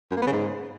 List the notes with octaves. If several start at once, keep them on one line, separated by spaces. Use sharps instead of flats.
F#2
A#3
B3
C#3
G#2